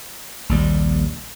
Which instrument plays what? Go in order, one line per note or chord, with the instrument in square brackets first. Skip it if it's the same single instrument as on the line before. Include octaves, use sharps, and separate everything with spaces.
[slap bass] A#1 D#2 G3